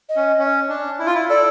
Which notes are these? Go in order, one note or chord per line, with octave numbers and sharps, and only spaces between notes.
D#5
C#4
C#4
D4
E4
F4
E4
A4 D5